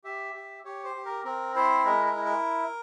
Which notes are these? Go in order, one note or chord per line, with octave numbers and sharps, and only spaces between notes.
G4 E5
G4
G4 C#5
C5
G4
A#4
C4 A#4
E4 C5
G#3 A#4
A#4
E4
A#4